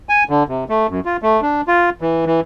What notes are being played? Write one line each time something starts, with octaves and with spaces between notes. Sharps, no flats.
G#5
D3
C3
A3
F#2
F4
A3
D4
F4
E3
E3